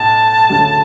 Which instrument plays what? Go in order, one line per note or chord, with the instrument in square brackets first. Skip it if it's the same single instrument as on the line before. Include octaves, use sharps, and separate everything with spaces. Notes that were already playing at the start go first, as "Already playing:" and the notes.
Already playing: [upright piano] B1 A2 [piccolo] A5
[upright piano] D2 C#3 F#3 A3